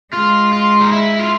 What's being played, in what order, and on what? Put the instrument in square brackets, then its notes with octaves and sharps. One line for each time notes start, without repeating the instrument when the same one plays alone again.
[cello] G#3 [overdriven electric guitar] F4
[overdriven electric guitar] F4
D#4
E4
F4